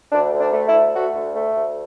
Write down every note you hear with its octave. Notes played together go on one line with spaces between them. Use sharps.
D2 D4
D2
D4
A3
E4
D2
A3 F#4
D2
A3
D2